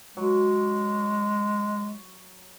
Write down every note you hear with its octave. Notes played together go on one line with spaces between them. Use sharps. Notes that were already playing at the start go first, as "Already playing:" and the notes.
F#3 G#3